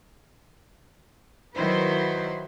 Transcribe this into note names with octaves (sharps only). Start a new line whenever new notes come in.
D#3 F#3 E4 B4 C5